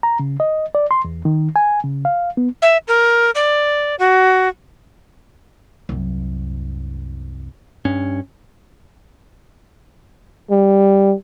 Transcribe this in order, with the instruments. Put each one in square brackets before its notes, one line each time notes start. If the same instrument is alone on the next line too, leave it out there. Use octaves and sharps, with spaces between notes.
[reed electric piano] A#5
C#3
D#5
D5
C6
E2
D#3
G#5
C#3
F5
B3
[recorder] E5
A#4
D5
F#4
[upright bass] C2 F#2
[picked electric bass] G2 C#4
[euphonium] G3